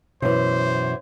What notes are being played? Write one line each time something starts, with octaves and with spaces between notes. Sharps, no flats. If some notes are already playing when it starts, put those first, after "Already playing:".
F#2 B2 E3 C5